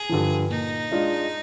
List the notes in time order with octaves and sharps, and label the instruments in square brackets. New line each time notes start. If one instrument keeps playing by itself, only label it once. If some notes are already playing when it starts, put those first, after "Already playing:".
Already playing: [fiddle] G#4
[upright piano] G2 D3 F3
[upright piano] A#2 [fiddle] D#4
[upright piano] G#3 D4 F4